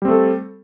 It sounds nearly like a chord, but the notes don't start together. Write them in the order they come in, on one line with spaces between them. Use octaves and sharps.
G3 C4 A3 A4